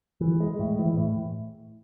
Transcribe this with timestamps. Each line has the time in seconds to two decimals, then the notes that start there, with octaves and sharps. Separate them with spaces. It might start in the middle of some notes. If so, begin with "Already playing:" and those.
0.21 E3
0.40 G#3
0.59 A2
0.79 E3
0.97 A2